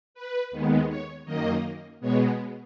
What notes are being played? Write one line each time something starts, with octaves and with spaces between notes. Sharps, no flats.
B4
D#2 D#3 G#3 B3
C#5
F#2 D#3 A#3 D#5
B2 G#3 B3 C#5